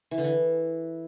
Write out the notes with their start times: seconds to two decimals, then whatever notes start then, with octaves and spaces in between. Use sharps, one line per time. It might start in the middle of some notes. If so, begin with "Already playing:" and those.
0.11 E3
0.18 D3
0.24 E3